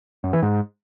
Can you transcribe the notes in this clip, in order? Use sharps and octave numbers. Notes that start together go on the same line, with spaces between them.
F#2
E3
G#2